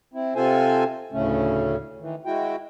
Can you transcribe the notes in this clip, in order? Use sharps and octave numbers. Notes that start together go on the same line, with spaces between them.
C4 E4
C3 C4 F4 A4 C5 G#5
D2 A2 C#3 A3 C#4
D#3 E3
G#3 E4 F#4 G5